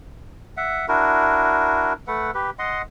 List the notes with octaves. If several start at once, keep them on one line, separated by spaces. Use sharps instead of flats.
E5 F#5
D4 E4 F#4 A#4
A3 B4 F#5
G4 B4
D#5 F#5 C6